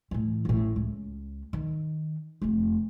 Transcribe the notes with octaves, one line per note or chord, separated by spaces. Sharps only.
A2 E3
A1 A2
C#2
D#3
F1 F2